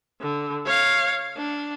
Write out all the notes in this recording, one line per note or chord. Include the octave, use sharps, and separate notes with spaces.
D3
C#5 F5
D4